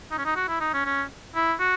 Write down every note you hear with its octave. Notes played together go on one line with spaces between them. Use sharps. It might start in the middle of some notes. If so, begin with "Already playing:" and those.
D#4
C#4
D#4
F#4
E4
D#4
C#4
C#4
E4
F#4